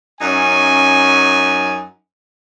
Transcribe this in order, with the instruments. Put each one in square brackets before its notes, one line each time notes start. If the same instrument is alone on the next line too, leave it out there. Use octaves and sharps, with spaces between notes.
[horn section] F#2 C#4 D#4 G#5